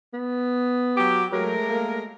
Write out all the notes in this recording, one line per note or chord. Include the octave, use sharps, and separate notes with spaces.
B3
F#3 F#4 G4
F#3 G#3 A3 A#4
A#3